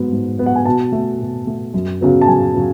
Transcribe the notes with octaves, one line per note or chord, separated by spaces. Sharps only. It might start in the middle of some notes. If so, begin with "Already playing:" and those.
Already playing: G#2 F#3 B3
G#2
F#3 B3
F#5
G#5
B2 A5
A3
B2
A3
F#2
C#3 F#3 B3
A5
F#2 G#5
C#3 F#3